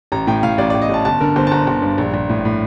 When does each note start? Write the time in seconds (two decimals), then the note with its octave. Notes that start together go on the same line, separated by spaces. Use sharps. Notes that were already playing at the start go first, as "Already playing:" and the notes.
0.12 A1 A#5
0.27 A2 G5
0.43 A2 F5
0.58 A1 D5
0.70 D5
0.74 A1
0.82 D#5
0.89 A1 A5
1.05 G1 A5
1.21 D3 A#4
1.36 G1 C5
1.47 A5
1.52 G1 A#5
1.67 G1
1.82 G2
1.98 A#1
2.14 A#1
2.29 A2
2.45 A2